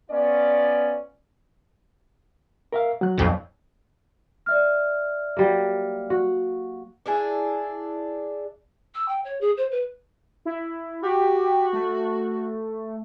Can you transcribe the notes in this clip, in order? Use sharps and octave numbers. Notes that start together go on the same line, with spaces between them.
B3 C#4 F4 D5
A#4 E5 F5
F#3 F#6
B1 F2 A#2
D5 E5 F6
F#3 G3 A#3
F#4
D4 E4 G#4
E6
G5
C#5
G#4
C5
B4
E4
F#4 G4
A3